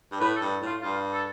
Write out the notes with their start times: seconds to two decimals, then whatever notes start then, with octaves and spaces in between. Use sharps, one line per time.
0.12 G2
0.20 A2 B4
0.36 A4
0.41 G2
0.62 A2 F4
0.82 G2 F4
1.13 A4